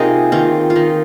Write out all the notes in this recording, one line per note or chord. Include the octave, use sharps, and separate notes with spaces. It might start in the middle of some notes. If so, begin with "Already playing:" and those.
Already playing: C3 A#3 C4 D#4 F4 G#4
D#3 A#3 C4 F4
F4
D#3 D#4